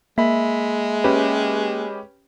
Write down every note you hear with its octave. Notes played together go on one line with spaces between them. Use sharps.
G#3 A#3 E5 B5
C#4 G4 B4